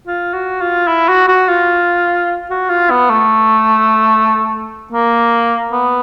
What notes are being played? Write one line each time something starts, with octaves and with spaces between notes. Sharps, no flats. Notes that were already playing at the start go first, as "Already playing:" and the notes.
F4
F#4
F4
E4
F#4
F#4
F4
F#4
F4
B3
A3
A#3
B3